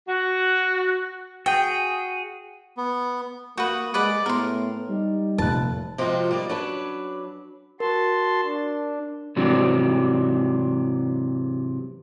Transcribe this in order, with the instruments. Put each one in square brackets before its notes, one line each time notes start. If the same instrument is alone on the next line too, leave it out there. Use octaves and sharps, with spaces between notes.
[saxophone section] F#4
[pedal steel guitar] F#4 G#4 [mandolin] G5
[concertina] B3
[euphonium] A#3 [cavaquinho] F#4 B4 [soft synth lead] D#6 [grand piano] G6
[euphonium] G#3 [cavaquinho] B4 D5 F#5
[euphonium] A2 [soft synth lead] B3 [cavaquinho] A#4 C6
[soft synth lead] G3 [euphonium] D#4
[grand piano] F1 A#2 F#6 [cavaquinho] A5
[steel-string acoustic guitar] C3 F3 G#3 C4 F4 F#4
G3 A#3 D#4 D5
F#3 C#4 D4 B4
[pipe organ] F#4 A5 C6 [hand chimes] A#4
[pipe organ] D4
[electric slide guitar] G#2 C3 E3 F#3 D4